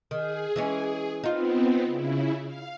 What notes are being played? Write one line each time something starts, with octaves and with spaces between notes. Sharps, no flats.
D#3 G#4
E3 G#3 C#4
B3 C4 D#4 F4
C#3 E4
F5